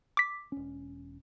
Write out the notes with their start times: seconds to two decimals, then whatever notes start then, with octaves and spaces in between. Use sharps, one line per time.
0.17 D6 B6
0.52 E1 C#4